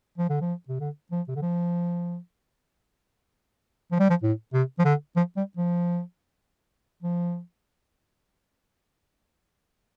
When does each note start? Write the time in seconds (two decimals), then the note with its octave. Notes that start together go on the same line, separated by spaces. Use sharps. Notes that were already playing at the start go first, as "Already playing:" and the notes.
0.18 F3
0.29 D3
0.41 F3
0.68 C3
0.80 D3
1.12 F3
1.28 C3
1.35 D3
1.42 F3
3.92 F3
4.00 G3
4.10 F3
4.23 A2
4.53 C3
4.79 F3
4.85 D3
5.16 F3
5.37 G3
5.57 F3
7.02 F3